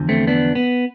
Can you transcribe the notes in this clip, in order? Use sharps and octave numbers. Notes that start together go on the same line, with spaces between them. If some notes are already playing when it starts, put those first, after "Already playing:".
Already playing: E2 D3 F3
A3 C4
B3 D4
B3